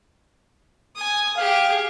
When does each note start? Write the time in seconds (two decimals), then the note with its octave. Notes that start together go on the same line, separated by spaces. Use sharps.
0.96 G#5 D#6
1.37 G4 G#4 F5